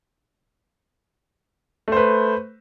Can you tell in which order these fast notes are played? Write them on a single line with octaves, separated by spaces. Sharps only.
A3 C5 B4